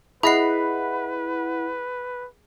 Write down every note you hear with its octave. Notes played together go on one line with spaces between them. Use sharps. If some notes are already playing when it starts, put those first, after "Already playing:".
E4 G#4 B4 D#5 F#5 B5 C7